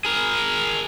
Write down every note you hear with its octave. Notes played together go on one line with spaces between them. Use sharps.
G#4 A#4